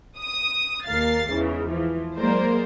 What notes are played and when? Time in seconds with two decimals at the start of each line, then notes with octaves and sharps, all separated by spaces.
0.19 D#6
0.86 D#2 A#3 A#4 F5 A6 C7
1.31 E2 G#2 C#3 E3
1.69 E3 F3
2.17 F#3 G#3 A#3 A#4 C5 D5